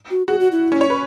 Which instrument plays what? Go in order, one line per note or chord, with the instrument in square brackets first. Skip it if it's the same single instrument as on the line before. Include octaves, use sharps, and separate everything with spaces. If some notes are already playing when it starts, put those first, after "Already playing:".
[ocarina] F#4
[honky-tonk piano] F#4 [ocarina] G#4
[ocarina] F#4
E4
[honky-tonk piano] C#4
C#5
B4